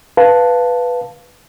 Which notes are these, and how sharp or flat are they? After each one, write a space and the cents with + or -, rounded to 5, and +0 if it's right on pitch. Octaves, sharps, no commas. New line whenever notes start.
B4 +0 F5 +0 A5 +0